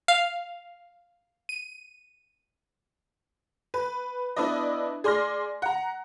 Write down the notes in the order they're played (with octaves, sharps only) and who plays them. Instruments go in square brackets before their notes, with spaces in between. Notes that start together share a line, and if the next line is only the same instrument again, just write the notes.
[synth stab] F5
D#7
[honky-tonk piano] B4
B3 D4 E4 B4 D5 D#5
G#4 D5 C6 F6 A#6
F#5 A#5